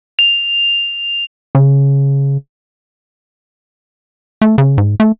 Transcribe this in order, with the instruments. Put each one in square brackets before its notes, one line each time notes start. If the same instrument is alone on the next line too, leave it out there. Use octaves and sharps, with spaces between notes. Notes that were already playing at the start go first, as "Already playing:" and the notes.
[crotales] F7
[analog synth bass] C#3
A3
C#3
G#2
A3